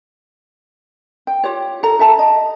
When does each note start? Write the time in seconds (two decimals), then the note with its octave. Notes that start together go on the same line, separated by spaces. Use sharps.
1.27 G5
1.44 F4 G4 C#5
1.83 A4 A#5
1.99 A4 E5 A5 A#5
2.19 D#5